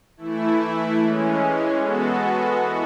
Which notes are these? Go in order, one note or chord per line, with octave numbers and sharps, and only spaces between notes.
E3 A3 E4
E3 G#3 C#4
G#3 B3 F#4 A4
E3 B3 F#4